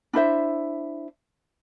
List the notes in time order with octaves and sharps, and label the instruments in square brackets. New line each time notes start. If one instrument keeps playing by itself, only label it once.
[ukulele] D4 E4 C5 E5